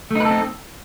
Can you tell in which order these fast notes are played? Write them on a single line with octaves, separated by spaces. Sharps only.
A3 D#4 B4 A4 C4